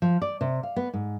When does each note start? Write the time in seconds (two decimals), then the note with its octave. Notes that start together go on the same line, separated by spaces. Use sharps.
0.02 F3
0.22 D5
0.41 C3
0.63 F5
0.76 B3
0.94 G#2